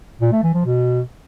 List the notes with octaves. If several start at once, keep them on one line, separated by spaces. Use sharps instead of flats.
A#2
A3
E3
F3
B2